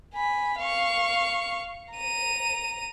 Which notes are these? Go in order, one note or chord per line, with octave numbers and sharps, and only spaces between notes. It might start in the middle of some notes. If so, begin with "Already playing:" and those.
G#5 B5
F5 C#6
A#5 D#7